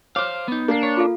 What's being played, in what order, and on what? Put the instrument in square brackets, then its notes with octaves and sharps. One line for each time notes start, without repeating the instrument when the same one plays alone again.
[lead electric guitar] C5 F5 [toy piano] C#5 [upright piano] D6 F6
[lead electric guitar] B3 D#4
[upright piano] A#3 C7 [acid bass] D4
[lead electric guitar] C#5
[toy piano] F4 A4 F5